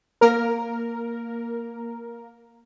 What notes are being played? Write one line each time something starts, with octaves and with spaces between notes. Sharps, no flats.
A#3 A#4